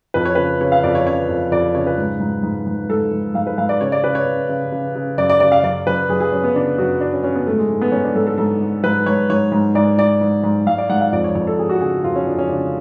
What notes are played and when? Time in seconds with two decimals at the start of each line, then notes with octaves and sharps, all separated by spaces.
0.14 F2 B4
0.25 C#5
0.35 C#3 B4
0.61 C#3 C#5
0.72 F5
0.83 F2 D5
0.95 C#5
1.07 C#3 C#5
1.29 F2
1.52 F2 D5
1.75 C#3 C#5
1.87 B4
1.98 G#2
2.20 G#2
2.43 G#2
2.67 G#2
2.89 G#2 A4
3.12 G#2
3.34 G#2 F5
3.47 B4
3.58 G#2 F5
3.69 D5
3.81 C#3 C#5
3.92 D5
4.04 C#3 B4
4.15 C#5
4.26 C#3
4.49 C#3
4.72 C#3
4.95 C#3
5.18 F#2 D5
5.30 D5
5.40 C#3 D5
5.52 F5
5.63 F#2 D5
5.87 F#2 B4
6.09 F#2 G#4
6.20 G#4
6.32 F#2 C#4
6.44 B3
6.55 C#3 D4
6.78 F#2 F#4
7.01 F#2 D4
7.13 C#4
7.24 C#3 C#4
7.36 B3
7.47 G#2 A3
7.58 G#3
7.70 G#2
7.81 B3
7.92 G#2 C#4
8.04 D4
8.15 G#2 A4
8.27 A4
8.38 G#2 A4
8.62 G#2
8.84 G#2 B4
9.06 G#2 C#5
9.30 G#2 C#5
9.52 G#2
9.75 G#2 D5
9.98 G#2 D5
10.21 G#2
10.44 G#2
10.67 G#2 F5
10.78 D5
10.90 G#2 F#5
11.01 F5
11.13 F2 D5
11.24 C#5
11.35 F2 C#5
11.47 A4
11.58 F2 G#4
11.69 F#4
11.81 C#3 G#4
12.04 F2 F4
12.16 C#4
12.27 F2 D4
12.38 C#4
12.49 C#3 D4